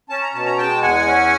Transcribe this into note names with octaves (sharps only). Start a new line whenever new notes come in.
C#4 A5
A#5
B2 A5
A#5
G#3 G5 A5
E2 F#5 G#5
C#4